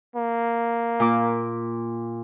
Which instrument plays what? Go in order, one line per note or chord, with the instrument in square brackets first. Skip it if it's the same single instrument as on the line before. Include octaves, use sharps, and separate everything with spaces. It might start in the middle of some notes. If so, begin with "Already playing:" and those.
[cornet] A#3
[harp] A#2 D6